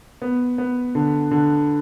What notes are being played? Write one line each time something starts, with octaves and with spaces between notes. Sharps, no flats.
B3
B3
D3
D3